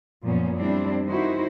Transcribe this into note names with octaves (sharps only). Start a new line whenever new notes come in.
F#2 A#2 F3 B3 C#4
G3 C4 D4 E4
D#3 D#4 E4 F#4 C5